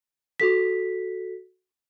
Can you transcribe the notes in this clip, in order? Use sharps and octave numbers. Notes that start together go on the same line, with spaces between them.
F#4 A4 B6